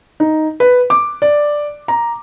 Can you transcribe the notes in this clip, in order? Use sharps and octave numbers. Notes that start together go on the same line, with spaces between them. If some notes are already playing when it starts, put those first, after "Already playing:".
D#4
B4
D6
D5
A#5